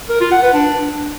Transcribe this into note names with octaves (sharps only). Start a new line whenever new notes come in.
A#4
F4
F#5
B4
D4